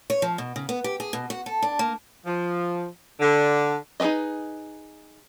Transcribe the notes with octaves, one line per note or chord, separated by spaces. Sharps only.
C#5
F3
B2
C#3
B3
G4
G#4
B2
F#4
A4
D4
A#3
F3
D3
D#4 G#4 A#4 B4 D#5